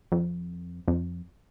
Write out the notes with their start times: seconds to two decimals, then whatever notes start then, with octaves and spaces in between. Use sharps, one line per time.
0.12 F2
0.88 F2